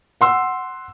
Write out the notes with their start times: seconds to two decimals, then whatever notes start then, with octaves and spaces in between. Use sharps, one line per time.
0.21 F#5 C6 E6